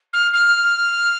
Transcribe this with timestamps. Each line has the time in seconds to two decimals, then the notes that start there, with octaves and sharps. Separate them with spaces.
0.13 F6
0.33 F6